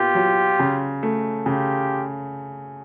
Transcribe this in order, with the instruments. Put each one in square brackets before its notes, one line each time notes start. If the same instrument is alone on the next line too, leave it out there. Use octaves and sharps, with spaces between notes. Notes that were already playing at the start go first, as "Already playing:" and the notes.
Already playing: [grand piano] A#2 B3 [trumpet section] F4 G4
[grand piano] F#3
C#3
A3
[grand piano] C#3 [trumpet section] F4 G4